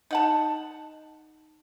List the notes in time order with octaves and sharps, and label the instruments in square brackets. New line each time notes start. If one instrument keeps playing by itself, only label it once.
[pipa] D#4 F#5 A5